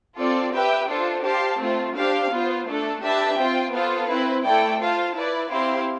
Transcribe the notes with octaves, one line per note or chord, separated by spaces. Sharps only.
C4 F4 A4 D5
G4 B4 E5 G5
D4 F4 A4 C5
G4 C5 F5 A5
A3 C4 F4
D4 G4 C5 F5
B3 F4 C5
A3 D4 A4
D4 G4 B4 E5 A5
C4 F4 C5 G5
B3 F4 A4 C5 F5
C4 E4 B4
A3 E4 A4 D5 G5
F4 C5 F5 A5
E4 B4 D5
C4 E4 G4 C5 F5